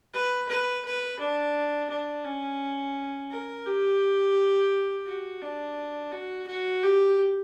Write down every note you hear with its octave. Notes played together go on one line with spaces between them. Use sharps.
B4
B4
B4
D4
D4
C#4
A#4
G4
F#4
D4
F#4
F#4
G4